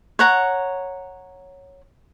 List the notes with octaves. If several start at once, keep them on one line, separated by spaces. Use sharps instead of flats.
C#5 F#5 A#5